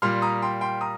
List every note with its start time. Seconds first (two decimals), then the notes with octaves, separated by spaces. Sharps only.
0.02 A#2 G3 C6 F6
0.22 A#5 D#6
0.42 G5 C6
0.61 G5 C6
0.81 A#5 D#6